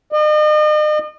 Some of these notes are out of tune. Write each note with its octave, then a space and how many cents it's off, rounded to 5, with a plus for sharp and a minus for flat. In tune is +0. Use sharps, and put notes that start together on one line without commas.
D#5 -40